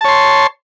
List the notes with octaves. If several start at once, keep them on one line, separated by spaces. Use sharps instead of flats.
C#5 A5 C6